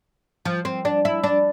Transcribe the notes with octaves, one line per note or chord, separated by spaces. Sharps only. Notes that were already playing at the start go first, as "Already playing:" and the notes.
F3
C4
D4
E4
D4